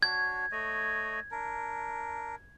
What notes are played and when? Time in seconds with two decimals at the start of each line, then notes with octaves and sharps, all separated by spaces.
0.03 D4 F#4 C#5 G#6
0.52 A3 C#5 D#5
1.31 D4 A#4